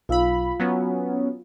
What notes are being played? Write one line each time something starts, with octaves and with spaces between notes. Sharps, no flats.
B1 F4 F5 B5 E6
F#3 B3 C#4